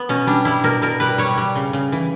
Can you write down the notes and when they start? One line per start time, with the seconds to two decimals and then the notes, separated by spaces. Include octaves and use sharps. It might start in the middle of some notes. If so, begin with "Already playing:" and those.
Already playing: B3
0.09 B2 C#4
0.27 G3 D4
0.45 G3 E4
0.64 B2 A#4
0.82 B2 A#4
1.00 G3 B4
1.18 G3 C#5
1.38 G3
1.55 C#3
1.73 C#3
1.92 E3